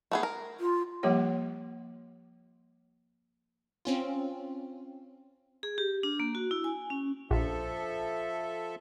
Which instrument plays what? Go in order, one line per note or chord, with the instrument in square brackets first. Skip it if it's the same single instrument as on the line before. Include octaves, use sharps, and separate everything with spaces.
[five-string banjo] A3 B3 G#4
A#4
[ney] F4
[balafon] F3 G3 A#3 G4 C#5 F#5
[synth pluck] C4 C#4 F4
[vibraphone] G#4
G4
D4
A#3
F#4
E4
G#5
C#4
[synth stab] A#1 [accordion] F3 A4 E5